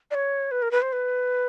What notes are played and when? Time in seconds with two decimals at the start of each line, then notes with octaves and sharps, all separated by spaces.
0.11 D5
0.14 C#5
0.51 B4
0.62 A#4
0.71 B4
0.82 C5
0.92 B4